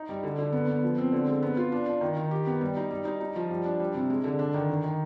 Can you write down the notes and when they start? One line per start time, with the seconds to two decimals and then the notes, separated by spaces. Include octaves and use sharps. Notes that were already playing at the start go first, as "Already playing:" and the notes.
Already playing: D#4
0.09 G3
0.23 D3
0.39 D3
0.52 B3
0.67 B3
0.83 F3
0.98 C4
1.12 D3
1.27 G#3
1.42 B3
1.57 F4
1.72 D4
1.86 D4
2.01 D#3
2.17 D#3
2.31 G4
2.47 B3
2.61 G3
2.76 D#4
2.91 G3
3.05 D#4
3.20 D#4
3.36 F3
3.50 G3
3.65 D4
3.80 G3
3.95 C3
4.10 G#3
4.24 D3
4.39 D4
4.54 D#3
4.70 D#3
4.84 D#3